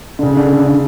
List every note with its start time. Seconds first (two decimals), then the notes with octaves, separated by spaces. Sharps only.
0.19 D3
0.23 C#3
0.37 D3
0.53 D3
0.67 D3